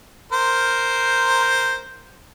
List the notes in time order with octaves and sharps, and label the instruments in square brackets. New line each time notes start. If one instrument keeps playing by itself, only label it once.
[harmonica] A#4 C5